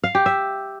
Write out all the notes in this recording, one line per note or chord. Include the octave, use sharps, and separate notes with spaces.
F5
G4
E5